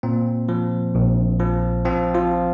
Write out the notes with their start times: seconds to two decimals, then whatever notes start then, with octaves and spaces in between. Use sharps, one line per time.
0.03 A#2 C4
0.49 F3
0.95 A#1
1.40 F3
1.85 F3 C4
2.15 F3 F4